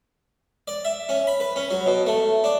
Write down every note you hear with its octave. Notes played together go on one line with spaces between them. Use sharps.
D5
E5
C#4
B5
B4
C#4
F#3
B2
A3
D4